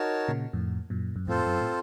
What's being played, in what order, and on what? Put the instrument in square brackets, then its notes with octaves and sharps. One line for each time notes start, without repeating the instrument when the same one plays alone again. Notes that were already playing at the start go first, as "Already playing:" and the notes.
Already playing: [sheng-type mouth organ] D#4 F#4 A#4 C#5 A5
[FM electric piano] A#2 C#3
F2 A2
F#2 A#2
F#2
[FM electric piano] F2 A2 [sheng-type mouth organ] C4 F4 A4 C5
[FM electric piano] F#2
A2